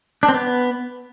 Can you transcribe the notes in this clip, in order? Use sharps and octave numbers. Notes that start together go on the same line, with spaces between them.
D4
C4
B3